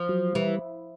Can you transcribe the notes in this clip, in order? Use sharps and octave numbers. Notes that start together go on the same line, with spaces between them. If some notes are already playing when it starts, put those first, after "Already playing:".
Already playing: F3
F#3
E3 G3